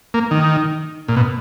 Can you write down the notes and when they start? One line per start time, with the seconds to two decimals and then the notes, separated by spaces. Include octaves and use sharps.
0.14 A#3
0.31 D#3
1.08 A#2
1.16 B2